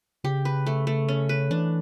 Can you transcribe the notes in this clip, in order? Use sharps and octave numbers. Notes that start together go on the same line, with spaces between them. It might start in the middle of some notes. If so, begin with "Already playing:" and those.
C#3 G4
B4
A3
A3
C#4
B4
E3 D4